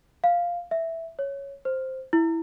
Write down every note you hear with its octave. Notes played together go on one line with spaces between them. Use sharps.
F5
E5
C#5
C5
E4